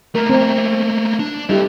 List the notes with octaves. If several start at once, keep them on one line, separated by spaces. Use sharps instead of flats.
A3 A#3 A#4
C4
D4
G3 E4 G4 A4 D#5